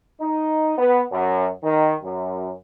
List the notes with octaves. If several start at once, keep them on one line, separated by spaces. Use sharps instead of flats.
D#4
B3
F#2
D#3
F#2